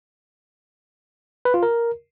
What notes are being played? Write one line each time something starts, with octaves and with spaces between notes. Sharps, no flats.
B4
F4
A#4